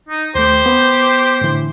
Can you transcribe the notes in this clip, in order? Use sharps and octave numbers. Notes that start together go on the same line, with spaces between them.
D#4
D#2 A3 G4 C5
B3
A2 D3 E3